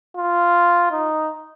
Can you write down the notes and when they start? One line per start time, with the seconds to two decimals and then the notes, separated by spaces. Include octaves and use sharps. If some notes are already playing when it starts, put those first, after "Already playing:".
0.17 F4
0.91 D#4